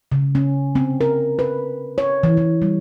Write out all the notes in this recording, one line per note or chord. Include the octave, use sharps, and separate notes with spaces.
C#3
C#4
C4
A#4
B4
C#5
E3
E3
G3